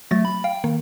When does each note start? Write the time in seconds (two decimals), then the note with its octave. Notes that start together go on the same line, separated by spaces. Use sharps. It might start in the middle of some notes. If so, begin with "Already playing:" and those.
0.11 F#3 A3 A6 A#6
0.25 B5
0.44 F5 G5
0.64 D#3 A#3